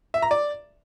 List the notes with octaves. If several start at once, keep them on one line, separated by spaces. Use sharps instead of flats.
E5
A#5
D5